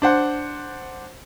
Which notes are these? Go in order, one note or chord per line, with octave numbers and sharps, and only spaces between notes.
D4 C5 F#5